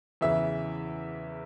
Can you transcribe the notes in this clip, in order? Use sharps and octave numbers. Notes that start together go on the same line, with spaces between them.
E2 C#3 E3 E5